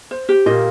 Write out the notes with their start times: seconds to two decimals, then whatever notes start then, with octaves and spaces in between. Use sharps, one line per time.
0.11 C5
0.29 G4
0.46 A#2 A#3 D#5